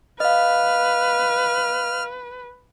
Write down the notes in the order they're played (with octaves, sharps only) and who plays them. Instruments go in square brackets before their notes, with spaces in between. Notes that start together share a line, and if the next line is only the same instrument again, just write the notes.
[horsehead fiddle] B4 [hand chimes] D#5 F5 [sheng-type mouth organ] F6